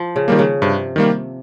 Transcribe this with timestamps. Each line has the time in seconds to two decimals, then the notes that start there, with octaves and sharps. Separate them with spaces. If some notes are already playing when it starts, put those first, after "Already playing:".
Already playing: F3
0.16 C#3
0.28 D#3 G3 A#3
0.39 C#3
0.62 G2 C3
0.96 D#3 G3 A#3